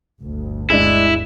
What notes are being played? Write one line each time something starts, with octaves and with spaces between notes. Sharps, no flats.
G1 D2
G#3 D4 E4